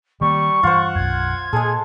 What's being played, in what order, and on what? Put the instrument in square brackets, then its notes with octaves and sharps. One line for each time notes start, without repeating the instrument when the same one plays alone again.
[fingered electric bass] D#3 A#3 [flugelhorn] G3 [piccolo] C#6
[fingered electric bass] G2 E3 [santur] F4 C5 [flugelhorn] F#5
[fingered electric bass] B1 F#2 [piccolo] G#6
[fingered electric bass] A#2 [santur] G#3 A4 [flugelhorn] G#4